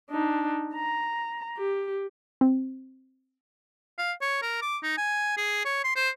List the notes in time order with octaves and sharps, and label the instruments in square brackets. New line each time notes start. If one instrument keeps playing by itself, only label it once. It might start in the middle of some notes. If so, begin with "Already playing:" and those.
[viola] D4 D#4
A#5
G4
[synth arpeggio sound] C4
[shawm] F5
C#5
A#4
D6
D#4
G#5
G#4
C#5
C6
C5